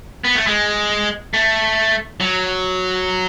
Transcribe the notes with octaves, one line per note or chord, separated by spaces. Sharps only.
B3
A3
G#3
A3
F#3